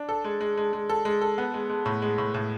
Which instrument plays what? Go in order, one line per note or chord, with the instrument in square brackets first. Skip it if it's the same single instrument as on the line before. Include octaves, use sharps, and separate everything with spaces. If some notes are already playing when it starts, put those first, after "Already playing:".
Already playing: [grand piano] D4
A4
G#3
G#3
G#3
G#3
A4
G#3
A4
B3
G#3
G#3
A2
G#3
A2
A2